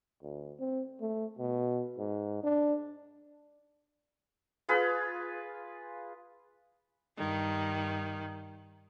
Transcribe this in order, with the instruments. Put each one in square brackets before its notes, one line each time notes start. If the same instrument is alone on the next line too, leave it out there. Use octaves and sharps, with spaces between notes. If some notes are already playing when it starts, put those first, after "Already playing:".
[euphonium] D2
C4
A3
B2
G#2
D4
[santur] F4 G#4 B4
[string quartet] G2 D#3